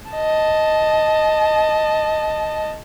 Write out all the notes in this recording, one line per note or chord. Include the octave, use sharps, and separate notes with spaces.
D#5 A5